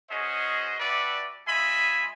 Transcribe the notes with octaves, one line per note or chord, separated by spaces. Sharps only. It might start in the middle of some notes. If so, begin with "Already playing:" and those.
C#4 F#4 G#4 C5 D#5
G3 D4 F#4 B4 D5 E5
G#3 F4 D#5 E5 G#5 B5